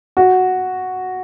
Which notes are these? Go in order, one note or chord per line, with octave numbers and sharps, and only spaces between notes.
F#4